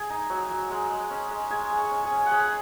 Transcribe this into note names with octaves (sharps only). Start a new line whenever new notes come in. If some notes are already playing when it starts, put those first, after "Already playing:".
Already playing: G#4 G#5
D#4
F#3
F#3
G#3
G#3
C#4
G#3
G#3 G#4 G#5
G#3
C#5 C#6
C#4
G#4 G#5
C#4
F#5
C#4 G#4 G#5